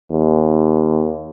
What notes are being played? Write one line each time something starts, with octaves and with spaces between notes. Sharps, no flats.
D#2